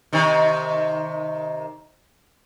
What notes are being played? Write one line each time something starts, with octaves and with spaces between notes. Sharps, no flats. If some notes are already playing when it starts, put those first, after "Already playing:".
C3 D#3